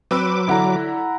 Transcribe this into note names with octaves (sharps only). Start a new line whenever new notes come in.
F#3 C4 B4 D6 E6
D3 E3 E4 F#5 A#5